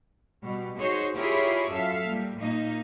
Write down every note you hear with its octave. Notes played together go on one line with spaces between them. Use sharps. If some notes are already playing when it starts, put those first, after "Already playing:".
B2 G3
D#4 F#4 G#4 C5 C#5
E4 F4 G4 G#4 A#4 C#5
F#2 A4 E5 F5
A#2 G3
A#2 A#3 D#4